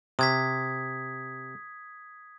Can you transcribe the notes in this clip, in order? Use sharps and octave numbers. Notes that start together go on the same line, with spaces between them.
C3 D#6 G#6 B6